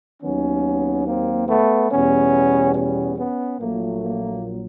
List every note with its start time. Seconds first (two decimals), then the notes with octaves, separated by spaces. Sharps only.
0.23 D#2 D#3 F#3 B3 C#4
1.07 A#3 C4
1.49 A3 B3
1.91 E2 B2 G3 B3 C#4
2.75 B3 C#4
3.18 B3 C#4
3.60 A#1 A#2 F#3 A3 A#3
4.02 A#3